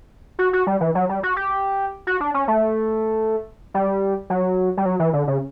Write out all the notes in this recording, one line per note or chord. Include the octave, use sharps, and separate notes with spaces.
F#4
F#4
G3
E3
F#3
G3
F#4
G4
F#4
D4
C#4
A3
G3
F#3
G3
F#3
E3
D3
C#3